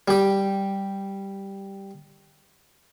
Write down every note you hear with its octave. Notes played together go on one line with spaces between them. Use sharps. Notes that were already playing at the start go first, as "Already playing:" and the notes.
G3 G4